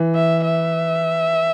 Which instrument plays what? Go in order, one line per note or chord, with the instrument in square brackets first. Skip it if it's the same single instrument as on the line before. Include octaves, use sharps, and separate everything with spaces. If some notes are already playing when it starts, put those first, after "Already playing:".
Already playing: [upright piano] E3
[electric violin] E5
E5